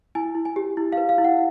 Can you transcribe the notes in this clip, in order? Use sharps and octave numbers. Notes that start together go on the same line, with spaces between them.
E4 G#5
E4
G#5
G4
E4
B4 F5
F5
E4
F#5